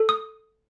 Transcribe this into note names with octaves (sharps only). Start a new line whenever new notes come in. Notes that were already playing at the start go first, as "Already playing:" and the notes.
Already playing: A4
D#6